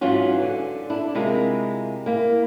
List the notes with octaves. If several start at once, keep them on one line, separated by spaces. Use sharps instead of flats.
G#2 E3 F#3 C#4 F4 F#4
D3
D4 E4
C3 G#3 E4 F4 A#4
A#3 E4